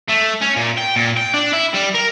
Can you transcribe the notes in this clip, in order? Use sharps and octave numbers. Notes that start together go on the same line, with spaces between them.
A3
C#4
A#2
G5
A#2
G5
D4
E4
G3
A#4